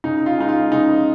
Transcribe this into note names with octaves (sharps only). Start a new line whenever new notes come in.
C#3 D#4
F4
G#3 D#4
F4
C#3 D#4